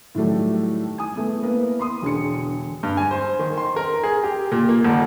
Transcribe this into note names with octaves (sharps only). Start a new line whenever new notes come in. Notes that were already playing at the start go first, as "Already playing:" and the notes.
A2 D#3 F#3 G3 A3
G#5 D#6
A3 B3
A#3 B3 E4 A#4 B4
B5 C6 D#6
E1 D3 G#4 C#7
G2
G#5
C5
D#3
C6
A#4
G#4
G4
A#2
A#3
D#1